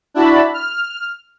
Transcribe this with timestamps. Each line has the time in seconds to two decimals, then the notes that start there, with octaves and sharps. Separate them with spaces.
0.14 D4 E4 F#4 A5 B5
0.53 F6